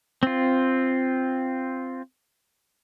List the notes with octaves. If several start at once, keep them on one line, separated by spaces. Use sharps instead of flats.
C4 F4